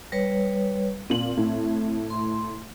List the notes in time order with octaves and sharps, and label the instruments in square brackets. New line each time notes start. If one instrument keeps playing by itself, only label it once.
[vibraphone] G3 B4 C#5
[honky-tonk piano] A#2 F#7 [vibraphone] C4
[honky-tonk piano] A2
[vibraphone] C6